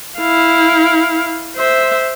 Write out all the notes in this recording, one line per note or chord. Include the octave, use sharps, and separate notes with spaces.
E4 F5
C5 E5